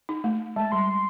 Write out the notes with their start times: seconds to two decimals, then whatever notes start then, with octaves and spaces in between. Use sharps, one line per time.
0.09 D#4
0.24 A3
0.56 G#3 A5
0.72 G3 C6